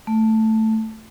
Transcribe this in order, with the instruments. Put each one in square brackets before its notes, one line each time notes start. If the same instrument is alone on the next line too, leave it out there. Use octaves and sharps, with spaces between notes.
[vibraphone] A3